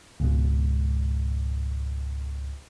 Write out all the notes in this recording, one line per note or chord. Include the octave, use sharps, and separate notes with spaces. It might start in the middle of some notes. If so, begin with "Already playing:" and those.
C#2 G#2 B2